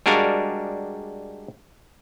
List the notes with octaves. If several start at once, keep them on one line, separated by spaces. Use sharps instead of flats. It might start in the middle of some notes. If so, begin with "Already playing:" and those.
G3 G#3 D4 F#4 A#4 F5